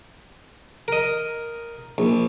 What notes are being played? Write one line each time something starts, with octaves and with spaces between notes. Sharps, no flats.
A#4 D#5
A#1